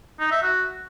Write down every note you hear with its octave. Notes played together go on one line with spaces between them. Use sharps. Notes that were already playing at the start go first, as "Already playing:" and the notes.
D#4
E5
F#4